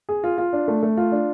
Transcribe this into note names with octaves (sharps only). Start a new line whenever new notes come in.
G#4
F4
F4
D4
A3
A3
F4
D4